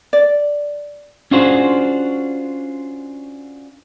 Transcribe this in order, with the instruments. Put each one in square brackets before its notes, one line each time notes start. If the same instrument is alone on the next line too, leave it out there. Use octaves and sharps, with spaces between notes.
[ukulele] D5
[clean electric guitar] C#4 D4 F4 F#4 G#4 C5